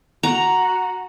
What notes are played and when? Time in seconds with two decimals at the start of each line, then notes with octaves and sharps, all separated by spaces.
0.23 F#4 A#5